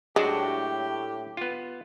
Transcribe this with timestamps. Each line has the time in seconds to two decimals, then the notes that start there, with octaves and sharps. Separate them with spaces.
0.16 A2 F#3 G#3 D4 F#4 G4
1.37 B3 F4